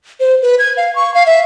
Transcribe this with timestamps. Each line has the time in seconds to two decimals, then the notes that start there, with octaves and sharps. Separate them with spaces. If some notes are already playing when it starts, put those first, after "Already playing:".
0.20 C5
0.42 B4
0.59 G#6
0.77 F5
0.95 C#6
1.14 F5
1.26 E5